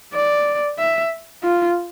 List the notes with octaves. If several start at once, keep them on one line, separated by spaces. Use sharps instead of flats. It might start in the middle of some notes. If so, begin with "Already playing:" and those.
D5
E5
F4